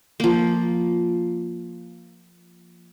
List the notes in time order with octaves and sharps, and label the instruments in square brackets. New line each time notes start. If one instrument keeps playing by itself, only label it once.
[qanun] F3 A#3